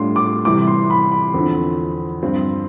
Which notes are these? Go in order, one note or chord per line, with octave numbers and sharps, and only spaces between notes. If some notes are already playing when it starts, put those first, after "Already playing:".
Already playing: A2 G3 D4 F4 C6
D6
C3 E3 G3 D6
C6
B5
B5
E2 D3 F3 C4
G2 F3 C4 F4